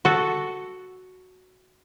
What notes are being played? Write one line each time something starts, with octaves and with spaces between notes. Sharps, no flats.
F#4 A4